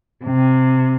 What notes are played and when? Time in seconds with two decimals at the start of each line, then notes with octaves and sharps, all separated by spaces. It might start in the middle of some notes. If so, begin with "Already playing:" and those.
0.25 C3